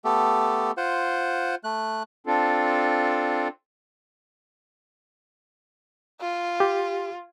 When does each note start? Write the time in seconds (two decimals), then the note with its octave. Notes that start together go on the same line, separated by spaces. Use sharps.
0.05 A3 B3 G4 A4
0.77 F4 C5 F#5
1.64 A3 F#6
2.27 C4 D4 F4 A4
6.21 F4
6.60 G4